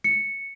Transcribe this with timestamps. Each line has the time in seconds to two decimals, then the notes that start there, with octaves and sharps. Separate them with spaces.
0.04 C#7